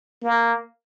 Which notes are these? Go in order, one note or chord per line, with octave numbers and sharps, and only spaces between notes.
A#3